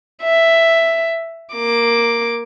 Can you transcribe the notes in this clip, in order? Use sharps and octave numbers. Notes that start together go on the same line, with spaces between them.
E5
A#3 D6